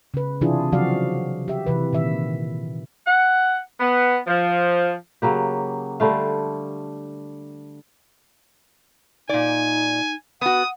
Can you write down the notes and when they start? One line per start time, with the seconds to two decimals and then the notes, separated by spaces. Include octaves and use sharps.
0.14 C#3 B4
0.41 C3 E3 D4 E4 F4 G#4
0.72 C#3 F3 F#3 F#4 D5 F5
1.48 G4 E5
1.66 C3 E3 B4
1.93 A#2 D#3 E5
3.06 F#5
3.80 B3
4.27 F3
5.22 C#3 F#3 A#3 G4
6.00 D3 G3 A3 F5
9.29 A#2 D#4 D5 G#5
10.42 B3 F#4 F#5 D#6